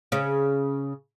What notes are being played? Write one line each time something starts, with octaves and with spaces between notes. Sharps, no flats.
C#3 C#4